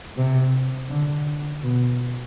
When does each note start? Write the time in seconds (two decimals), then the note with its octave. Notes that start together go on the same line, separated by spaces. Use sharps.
0.16 C3
0.89 D3
1.63 B2